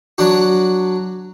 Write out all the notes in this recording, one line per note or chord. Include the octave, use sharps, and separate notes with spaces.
F#3 D4 F#4